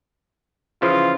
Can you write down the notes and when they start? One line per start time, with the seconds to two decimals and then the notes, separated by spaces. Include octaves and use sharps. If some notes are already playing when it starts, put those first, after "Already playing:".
0.82 C#3 E3 F3 F4